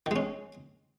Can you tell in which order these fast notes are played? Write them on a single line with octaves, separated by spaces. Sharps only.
D#3 G#3 C#4